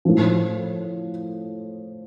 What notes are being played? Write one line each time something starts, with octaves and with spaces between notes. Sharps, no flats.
A2 F3